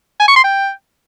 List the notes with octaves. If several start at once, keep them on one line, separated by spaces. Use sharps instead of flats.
G#5
C#6
C6
G5